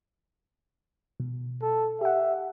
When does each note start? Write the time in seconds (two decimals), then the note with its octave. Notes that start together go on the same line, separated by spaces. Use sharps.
1.20 B2
1.62 A4
2.01 G4 E5 F#5